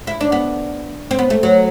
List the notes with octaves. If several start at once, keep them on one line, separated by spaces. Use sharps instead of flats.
E4
D4
B3
C4
B3
A3
F#3